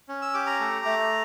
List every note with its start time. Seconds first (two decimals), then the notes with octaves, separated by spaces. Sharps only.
0.08 C#4
0.22 E6
0.34 G4 D6
0.47 A#5
0.60 A3
0.86 A3